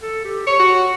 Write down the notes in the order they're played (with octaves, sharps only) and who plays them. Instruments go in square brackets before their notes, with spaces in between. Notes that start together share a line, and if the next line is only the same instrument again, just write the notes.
[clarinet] A4
G4
[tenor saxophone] C#5 [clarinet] C#6
[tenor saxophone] F#4